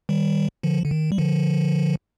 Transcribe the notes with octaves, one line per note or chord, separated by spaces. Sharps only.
D#3 G3
D3 F3
D3
D#3
G3
D3 F3